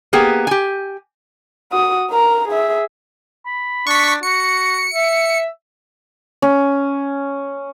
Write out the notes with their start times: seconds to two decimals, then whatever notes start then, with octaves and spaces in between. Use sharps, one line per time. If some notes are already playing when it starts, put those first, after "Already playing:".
0.13 A#3 B3 G4 G#4
0.47 G4 G#5
1.72 F#4 D#6
2.11 A#4 A#5
2.48 G#4 E5
3.46 B5
3.87 D4 C#6 B6
4.23 F#4 C#7
4.94 E5
6.42 C#4